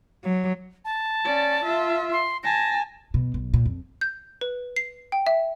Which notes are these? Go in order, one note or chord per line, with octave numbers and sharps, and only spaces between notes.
F#3
A5
C#4 D5
F4 E5
C6
G#5 A5 A#6
B2
B1
A#2
F2
G6
B4
C7
G5
E5